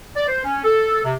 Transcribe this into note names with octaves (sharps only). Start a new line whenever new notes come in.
D5
C5
C#4
A4
C3